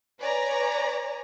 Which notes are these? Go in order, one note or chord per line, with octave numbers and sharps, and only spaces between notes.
B4 C#5 D5 G#5 A#5